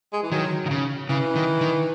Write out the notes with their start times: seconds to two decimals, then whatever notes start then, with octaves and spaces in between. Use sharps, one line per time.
0.13 G#3
0.23 E3
0.32 D#3 F#3
0.66 D#3
0.71 C#3
1.09 C#3 E3
1.36 D#3
1.61 D#3